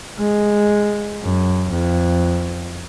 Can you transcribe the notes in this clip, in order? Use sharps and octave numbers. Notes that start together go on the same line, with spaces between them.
G#3
F#2
F2